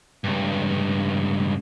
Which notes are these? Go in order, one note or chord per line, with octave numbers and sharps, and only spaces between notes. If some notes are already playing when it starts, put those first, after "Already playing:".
C#2 G2